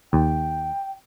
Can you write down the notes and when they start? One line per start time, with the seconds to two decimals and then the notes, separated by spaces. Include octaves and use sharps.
0.13 D#2 G5